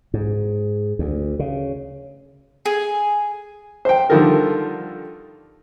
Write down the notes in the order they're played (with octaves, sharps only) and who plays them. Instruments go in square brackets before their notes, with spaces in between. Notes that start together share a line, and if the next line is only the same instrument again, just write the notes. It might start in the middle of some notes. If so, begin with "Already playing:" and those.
[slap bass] G#2
D2
C#3
[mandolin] G#4
[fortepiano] C5 G5
D3 D#3 F3 G3 A4 A#4